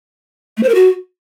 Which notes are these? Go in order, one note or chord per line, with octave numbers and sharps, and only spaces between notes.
A3
C5
A#4
F#4